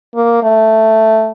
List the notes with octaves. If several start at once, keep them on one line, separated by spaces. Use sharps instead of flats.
A#3
A3